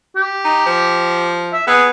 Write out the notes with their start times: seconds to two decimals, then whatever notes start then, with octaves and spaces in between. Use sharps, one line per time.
0.16 G4
0.45 D#4
0.66 F3
1.53 E5
1.67 B3 G#4